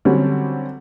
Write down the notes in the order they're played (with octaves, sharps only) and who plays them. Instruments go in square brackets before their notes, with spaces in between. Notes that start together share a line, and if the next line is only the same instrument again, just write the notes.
[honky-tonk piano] D3 F#3 G3 C4 C#4